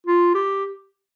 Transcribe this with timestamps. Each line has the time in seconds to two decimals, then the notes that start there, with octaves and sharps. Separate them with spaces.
0.06 F4
0.34 G4